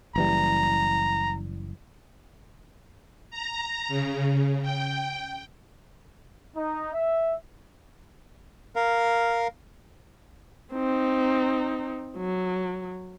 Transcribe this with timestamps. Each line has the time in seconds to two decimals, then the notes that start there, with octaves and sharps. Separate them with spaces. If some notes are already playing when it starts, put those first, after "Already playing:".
0.16 F#1 E3 G3 A#5
3.30 A#5
3.88 C#3
4.62 G5
6.56 D#4
6.93 E5
8.76 A#4 F5
10.74 C4 D#4
12.17 F#3